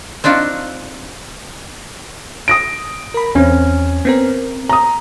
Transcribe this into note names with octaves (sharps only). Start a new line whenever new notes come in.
C4 D4 D#4 F4 F#4
D#6 A#6 D7
A#4 B5
E2 C4 C#4
B3 C4 A#4
A#5 D#6